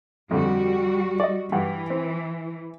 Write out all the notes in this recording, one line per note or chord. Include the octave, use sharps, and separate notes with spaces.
F2 D3 G3 F#4
D5 D#5
G2 E3 F#5
C4